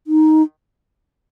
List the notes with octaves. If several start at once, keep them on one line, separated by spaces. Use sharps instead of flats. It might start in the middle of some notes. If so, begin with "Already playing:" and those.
D#4